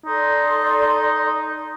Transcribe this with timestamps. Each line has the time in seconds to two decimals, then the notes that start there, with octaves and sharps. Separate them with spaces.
0.06 D#4 A4 D5 C6